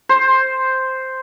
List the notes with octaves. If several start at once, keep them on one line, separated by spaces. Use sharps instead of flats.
C5